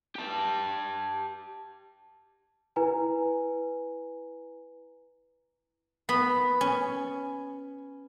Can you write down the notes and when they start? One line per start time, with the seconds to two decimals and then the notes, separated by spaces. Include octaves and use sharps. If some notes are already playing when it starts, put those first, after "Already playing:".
0.16 G4 A5
2.76 E4 B4 G#5 A#5
6.09 B3 B5
6.61 C#4